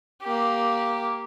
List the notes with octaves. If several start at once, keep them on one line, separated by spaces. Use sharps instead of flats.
A#3 G4